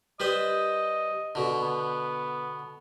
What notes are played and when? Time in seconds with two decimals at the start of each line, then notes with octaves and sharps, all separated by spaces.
0.20 G3 B4 C5 D#5
1.35 B2 D3
1.62 B3